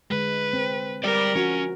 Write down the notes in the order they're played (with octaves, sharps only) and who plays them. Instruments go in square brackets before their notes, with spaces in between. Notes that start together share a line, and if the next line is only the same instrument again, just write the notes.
[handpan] D3 G#3 [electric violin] B4
[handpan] C4
[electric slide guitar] G3 G4 D5 [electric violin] A#4
[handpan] F3 F#4 [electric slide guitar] C#4